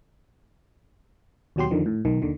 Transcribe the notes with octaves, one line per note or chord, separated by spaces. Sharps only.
D#2 B2 F#3 G4 C6
F2 D3 D#3 F3
A2
B1 D#3
D#2 D3 D#3